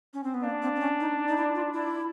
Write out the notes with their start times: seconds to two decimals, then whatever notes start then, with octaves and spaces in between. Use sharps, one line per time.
0.14 C#4
0.23 C4
0.34 B3
0.44 A#3 D4
0.62 C4
0.76 C4
0.80 C#4
1.00 D#4
1.28 D#4
1.37 E4
1.55 F4
1.74 E4